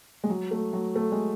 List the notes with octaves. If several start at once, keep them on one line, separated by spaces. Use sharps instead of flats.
G#3
F#3
A3
F#3
A3
G#3